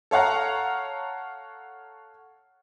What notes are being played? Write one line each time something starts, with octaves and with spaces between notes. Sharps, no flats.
A4 C#5 F5 F#5 A#5